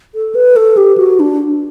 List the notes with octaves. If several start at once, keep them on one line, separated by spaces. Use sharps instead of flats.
A4
B4
A4
G4
F#4
D4